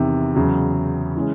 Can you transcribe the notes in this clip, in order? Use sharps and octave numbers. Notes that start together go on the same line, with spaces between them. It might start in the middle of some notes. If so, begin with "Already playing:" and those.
Already playing: E2 C3 D#3
E2 C#3 F#3
C#3 E3 G#3 C#4